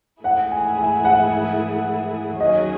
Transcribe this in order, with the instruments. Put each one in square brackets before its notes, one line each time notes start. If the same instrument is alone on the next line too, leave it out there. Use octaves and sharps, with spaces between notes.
[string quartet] G#2 E3 A3 E4 G#4 [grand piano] F#5
[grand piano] G#5
G#5
F#5
[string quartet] D#2 D#3 F#3 C#4 G#4 [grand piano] D#5